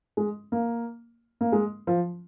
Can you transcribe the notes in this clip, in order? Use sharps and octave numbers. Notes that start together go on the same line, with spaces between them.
G#3
A#3
A#3
G#3
F3